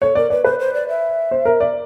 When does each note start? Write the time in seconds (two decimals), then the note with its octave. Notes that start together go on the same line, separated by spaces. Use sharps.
0.02 A4 C#5
0.15 A#4 D5
0.30 B4 D5
0.44 B4 C5
0.59 C5
0.74 D5
0.89 E5
1.31 C5
1.45 A#4
1.60 D5